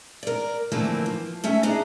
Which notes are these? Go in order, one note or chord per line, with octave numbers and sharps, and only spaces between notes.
A#4 D5
D3 E3 F3 A3 A#3 C4
F3
A3 C#4 E5
D4 G#4 D#5 A#5